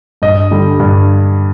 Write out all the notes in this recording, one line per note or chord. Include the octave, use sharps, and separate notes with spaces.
G2 D#5
D3 G3
G2